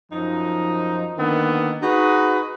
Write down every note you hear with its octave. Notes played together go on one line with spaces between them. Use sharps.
F#2 F3 D#4
D3 D#3 A#3 B3
D#4 F#4 G#4 B4